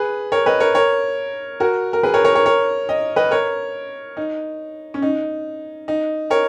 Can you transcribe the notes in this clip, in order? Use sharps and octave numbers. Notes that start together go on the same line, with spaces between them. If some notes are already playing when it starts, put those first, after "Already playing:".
Already playing: G#4 B4
A#4 C#5
B4 D#5
A#4 C#5
A#4 C#5
F#4 A#4
A#4
G#4 B4
A#4 C#5
A#4 C#5
A#4 C#5
A#4 C#5
D#5
B4 D#5
A#4 C#5
D#4
C#4
D#4
D#4
A#4 C#5